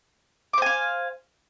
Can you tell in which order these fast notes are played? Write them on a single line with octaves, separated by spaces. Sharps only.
D6 C5 G#5 F5